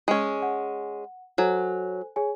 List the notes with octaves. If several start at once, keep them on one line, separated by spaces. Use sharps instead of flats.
G#3 C#4
F#5
F#3 A4 C5 G#5
G#4 C#5 G#5